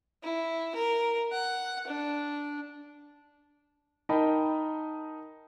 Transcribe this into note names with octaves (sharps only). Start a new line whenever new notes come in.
E4
A#4
F#5
D4
D#4 A#4 D#5 G5 A5 B5